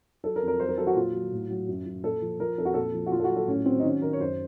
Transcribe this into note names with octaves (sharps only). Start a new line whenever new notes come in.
F#3 A4
A#4
F2
A#4
F#3 C5
A#4
F#3 A4
F#4
A#2 F4
F#3
A2
F#3
F#2
F#2
A#2 A4
F3
F3 A#4
F2 A4
F#4
A#2 A4
F3
F#4
A#2 F4
A4
F#4
F#3
A4
A2 C#4
F#3 C4
D#4
D#3 C#4
D#3 A#4
C#5
F#2 C5